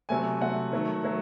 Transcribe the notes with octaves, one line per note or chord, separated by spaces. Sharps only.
C3 F#3 A3 G#5
C3 F#3 A3 F#5
D#3 F#3 A3
F#3 A3